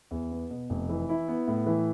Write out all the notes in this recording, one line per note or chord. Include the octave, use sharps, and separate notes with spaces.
E2
B3
B2
F1
E3
E4
B3
A2
E3